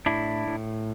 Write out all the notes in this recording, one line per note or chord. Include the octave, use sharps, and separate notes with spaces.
A2 D4 E4
A2